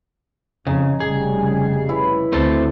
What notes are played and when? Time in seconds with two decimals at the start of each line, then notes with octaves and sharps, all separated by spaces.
0.67 F2 C#3 D#4 G#5
1.00 F1 C#3 G3 G#4
1.89 E4 B4 C#5
2.33 D2 A3 C4 A4